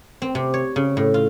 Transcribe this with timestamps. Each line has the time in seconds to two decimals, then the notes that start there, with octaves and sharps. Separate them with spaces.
0.22 C4
0.35 C3
0.54 C#5
0.76 C#3
0.97 A2
1.14 F4